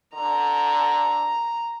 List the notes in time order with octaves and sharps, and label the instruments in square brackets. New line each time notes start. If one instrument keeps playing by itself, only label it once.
[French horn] D3 [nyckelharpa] A#5